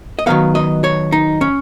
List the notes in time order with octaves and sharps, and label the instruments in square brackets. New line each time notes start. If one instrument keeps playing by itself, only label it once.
[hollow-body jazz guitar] D#5
D#3 F#3 B3 F5
D#5
C#5
D#4
C#4